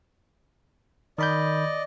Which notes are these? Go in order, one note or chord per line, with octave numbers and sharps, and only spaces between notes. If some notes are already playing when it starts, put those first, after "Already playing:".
D#3 D5 D#5 B5 G6